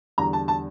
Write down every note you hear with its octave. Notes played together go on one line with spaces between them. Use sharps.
E2 D3 G3 A#5
A5
A5